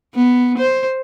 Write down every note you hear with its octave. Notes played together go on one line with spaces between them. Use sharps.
B3
C5